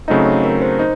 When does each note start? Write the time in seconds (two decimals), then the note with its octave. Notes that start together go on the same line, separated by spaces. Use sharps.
0.08 C#3 F#3 A3 C4 D#4 D#5
0.26 C#5
0.44 A#4
0.62 C5
0.79 D#4 C5